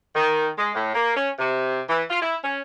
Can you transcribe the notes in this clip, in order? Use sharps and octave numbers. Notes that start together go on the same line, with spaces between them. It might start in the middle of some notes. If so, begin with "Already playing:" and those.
D#3
G#3
A2
A#3
C#4
C3
E3
F4
E4
C#4